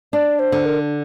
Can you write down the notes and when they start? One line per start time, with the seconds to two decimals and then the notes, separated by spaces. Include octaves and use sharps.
0.13 D4 D5
0.39 C5
0.52 D3
0.65 A#4